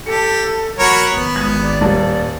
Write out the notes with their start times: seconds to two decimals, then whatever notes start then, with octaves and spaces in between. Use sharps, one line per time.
0.06 G4 A4 A5 C#7
0.78 F3 A#3 F#4 A#4 C#5 B5
1.12 A1 D#2 B3
1.36 G#1 D#6 G#6
1.63 D5
1.81 D#1 A2 F#3 G3